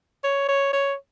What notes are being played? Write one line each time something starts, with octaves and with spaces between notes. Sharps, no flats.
C#5
C#5
C#5